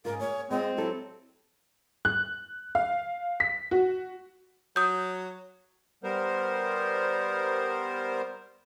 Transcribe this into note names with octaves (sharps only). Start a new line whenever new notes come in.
G#2 C#3 F4 G#4 A#4
A#3 C#5
G#3 C4 F4 D#5
F#3 E4 G4 A4
F#6
F5
B6
F#4
F#3 D#6 G6
G3 B3 A#4 C5